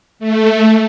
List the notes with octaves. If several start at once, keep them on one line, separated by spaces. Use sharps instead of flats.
A3